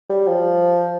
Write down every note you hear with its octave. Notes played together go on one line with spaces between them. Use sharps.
G3
F3